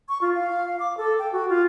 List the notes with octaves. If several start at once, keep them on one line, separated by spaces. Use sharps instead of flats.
C#6
F4
F5
D6
A4
G5
F#4
F4